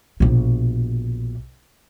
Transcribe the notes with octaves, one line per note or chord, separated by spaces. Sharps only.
A#1 B2